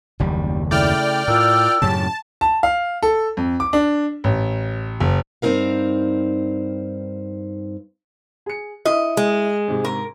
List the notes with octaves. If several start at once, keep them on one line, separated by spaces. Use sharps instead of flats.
F#1 D#2 G3
C#3 A3 E4 D5 G5 F6
A2 F4 A#4 E6
F#2 A2 C#3 C#4 G4 A5
A5
F5
A4
F2
D6
D4
A1
F#1
G2 C4 D#4 E4 A#4 F5
G#4 C#7
E4 D#5 E5
G#3
G#2 C3
A#4